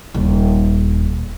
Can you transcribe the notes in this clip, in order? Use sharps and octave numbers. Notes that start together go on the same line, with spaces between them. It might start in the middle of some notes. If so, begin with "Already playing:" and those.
D#1